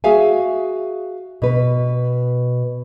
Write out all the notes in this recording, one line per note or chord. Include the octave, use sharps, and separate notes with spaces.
F#4 G#4 E5 F5 G#5
B2 B4